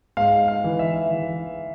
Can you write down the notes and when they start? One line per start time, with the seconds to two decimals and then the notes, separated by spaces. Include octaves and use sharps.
0.17 G#2 F5
0.48 F5
0.64 E3
0.79 E5
1.10 E3